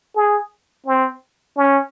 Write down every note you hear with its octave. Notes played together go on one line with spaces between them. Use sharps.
G#4
C4
C#4